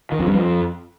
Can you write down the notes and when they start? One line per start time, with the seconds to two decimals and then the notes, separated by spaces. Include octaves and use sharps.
0.12 D#3
0.19 F2
0.27 G2
0.34 F2